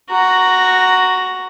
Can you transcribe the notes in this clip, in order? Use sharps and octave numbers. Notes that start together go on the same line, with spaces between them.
F#4 A#5